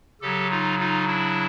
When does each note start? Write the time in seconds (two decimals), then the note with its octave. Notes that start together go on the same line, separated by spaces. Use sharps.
0.21 C#3 F#3 G4 A4
0.50 D#4 F4
0.79 D#4 F4
1.07 D4 E4